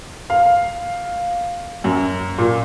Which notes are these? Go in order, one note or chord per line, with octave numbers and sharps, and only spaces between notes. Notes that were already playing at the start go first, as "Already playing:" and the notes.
F5
F#2
A#2